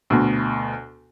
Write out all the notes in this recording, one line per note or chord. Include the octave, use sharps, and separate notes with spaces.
D2 B2